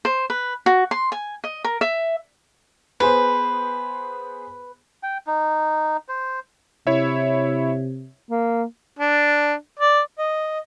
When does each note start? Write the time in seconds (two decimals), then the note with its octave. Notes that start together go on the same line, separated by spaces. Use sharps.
0.05 C5
0.30 B4
0.66 F#4
0.91 C6
1.12 G#5
1.44 D#5
1.64 A#4
1.81 E5
3.00 B3 G#4 B4 C5
5.03 G5
5.27 D#4
6.08 C5
6.87 C3 E4 C#5 E5
8.29 A#3
8.99 D4
9.80 D5
10.18 D#5